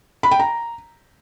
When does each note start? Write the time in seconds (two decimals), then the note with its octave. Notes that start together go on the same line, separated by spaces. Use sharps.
0.23 B5
0.31 G5
0.40 A#5